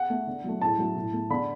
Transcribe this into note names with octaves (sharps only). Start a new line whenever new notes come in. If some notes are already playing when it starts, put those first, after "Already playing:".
Already playing: F#5
A3
D3
F#3 A3
A2 A5
F#3 A3
A2
A3
D3 B5